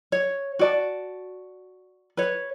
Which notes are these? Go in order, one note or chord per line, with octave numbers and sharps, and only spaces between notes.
C#5
F#4 D5 A5
B4 C#5